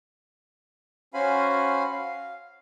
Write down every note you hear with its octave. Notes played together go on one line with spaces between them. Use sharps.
C#4 F#4 C5 F5 G#5 B5
F5